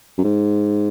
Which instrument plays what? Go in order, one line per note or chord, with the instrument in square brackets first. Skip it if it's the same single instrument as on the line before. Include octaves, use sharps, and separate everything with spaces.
[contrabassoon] F#2
G#2